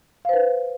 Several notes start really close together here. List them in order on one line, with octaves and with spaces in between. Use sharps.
F5 C5 B4